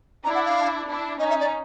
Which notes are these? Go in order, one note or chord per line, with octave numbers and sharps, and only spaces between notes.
D4 E4 A#5
F#5
F5
D4 E4
C#4 D#4 D#5
E5
D5